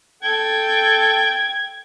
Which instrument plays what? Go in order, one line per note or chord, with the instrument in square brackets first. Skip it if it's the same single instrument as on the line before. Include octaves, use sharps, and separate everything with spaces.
[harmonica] A4 G5 [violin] G#6